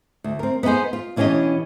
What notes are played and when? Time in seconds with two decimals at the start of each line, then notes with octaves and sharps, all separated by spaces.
0.24 D2
0.39 C4 A#4
0.63 B3 D#4 E4 G#4 C5
0.93 F4
1.16 B2 E3 C#4 D4 G4 D#5